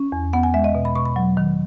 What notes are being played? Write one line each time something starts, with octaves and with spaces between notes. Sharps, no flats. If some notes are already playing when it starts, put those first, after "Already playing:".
Already playing: C#4
E2
B3 F#5
G#5
G#3 E5
D#5
B2
B5
B2 C#6
B5
F#3
D#3